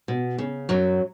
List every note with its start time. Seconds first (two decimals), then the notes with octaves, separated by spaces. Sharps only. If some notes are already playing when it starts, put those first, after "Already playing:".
0.08 B2
0.38 C#3
0.69 F#2 F#3